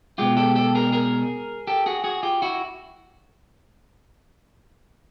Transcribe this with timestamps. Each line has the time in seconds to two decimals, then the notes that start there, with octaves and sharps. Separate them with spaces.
0.18 B2 G#3 F4 G4
0.37 G4 A4
0.55 G4 A4
0.75 G#4 A#4
0.92 G#4 A#4
1.67 G4 A4
1.86 F#4 G#4
2.04 F#4 G#4
2.23 F4 G4
2.42 E4 F#4